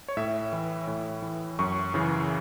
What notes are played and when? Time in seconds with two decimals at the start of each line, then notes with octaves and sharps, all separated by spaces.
0.08 C#5
0.17 A2 E5
0.53 E3
0.87 A2
1.22 E3
1.59 F#2 C#6
1.94 C#3 E3